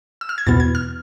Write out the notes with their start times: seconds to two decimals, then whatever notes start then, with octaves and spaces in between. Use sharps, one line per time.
0.21 E6
0.29 F6
0.38 G#6
0.47 E2 B2 B3 A6
0.60 G#6
0.75 F6